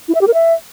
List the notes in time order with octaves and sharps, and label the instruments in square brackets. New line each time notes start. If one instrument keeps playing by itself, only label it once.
[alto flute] E4
E5
G4
A#4
E5